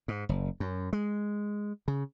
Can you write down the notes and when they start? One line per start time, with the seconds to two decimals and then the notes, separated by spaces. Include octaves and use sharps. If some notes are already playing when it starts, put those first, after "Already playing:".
0.08 G#2
0.29 F#1
0.60 F#2
0.93 G#3
1.88 C#3